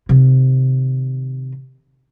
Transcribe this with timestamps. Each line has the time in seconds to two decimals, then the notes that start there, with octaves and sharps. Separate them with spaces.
0.09 C3 D#3